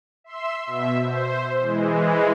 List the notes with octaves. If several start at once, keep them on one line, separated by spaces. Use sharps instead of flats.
E5 C6 E6
B2 E5
C5
E3 G#3